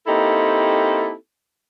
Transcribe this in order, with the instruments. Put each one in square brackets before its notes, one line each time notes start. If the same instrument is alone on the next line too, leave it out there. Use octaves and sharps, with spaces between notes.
[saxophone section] A#3 C4 D#4 E4 G4 A4